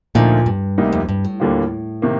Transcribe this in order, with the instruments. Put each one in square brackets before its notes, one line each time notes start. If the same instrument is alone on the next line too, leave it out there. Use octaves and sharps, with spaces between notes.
[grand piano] D2 D3 F3 A#3 D#4 [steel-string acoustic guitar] A#2
[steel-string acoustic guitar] G2
[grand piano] D2 C3 G3 A#3 D#4
[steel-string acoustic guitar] F2
G2
A2
[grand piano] D#2 D3 G3 A#3 F4
C3 D#3 A#3